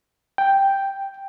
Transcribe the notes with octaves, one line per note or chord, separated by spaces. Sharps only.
G5